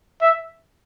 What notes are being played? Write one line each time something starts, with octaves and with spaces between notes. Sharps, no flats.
E5